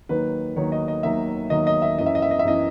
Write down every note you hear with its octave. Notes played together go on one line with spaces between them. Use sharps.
D#2 D#3 F#3 B4
D#2 D#3 F#3 C#5
D#5
D#5
D#2 D#3 F#3 E5
D#2 D#3 F#3 D#5
D#5
E5
F#2 E3 D#5
E5
D#5
E5
D#5
E5
F#2 E3 D#5